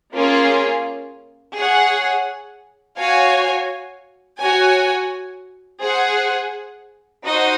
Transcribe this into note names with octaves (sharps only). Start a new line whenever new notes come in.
A#3 C#4 F4 G#4
G#4 C#5 F#5
F#4 C#5 F5 G#5
F#4 C#5 G#5
G#4 C5 F#5
D#4 F#4 C5 D#5